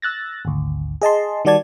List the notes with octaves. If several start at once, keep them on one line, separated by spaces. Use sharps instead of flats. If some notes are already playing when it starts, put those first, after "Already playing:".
E6 F#6 A6 A#6
G#1 D2
G#4 D#5 A5 C6
D#3 G3 F#4 D5 A5 G#6